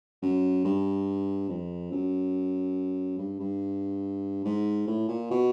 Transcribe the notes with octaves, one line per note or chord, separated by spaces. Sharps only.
F#2
G2
F2
F#2
G2
G2
G#2
A2
A#2
B2